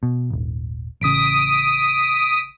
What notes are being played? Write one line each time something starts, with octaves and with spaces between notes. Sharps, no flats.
B2
D#1 G#1
A1 C#3 D#6 B6 D7